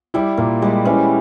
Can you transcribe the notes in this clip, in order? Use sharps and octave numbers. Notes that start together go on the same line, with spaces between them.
G3 E4
A#2 A#3
G3 G#3
E3 C#4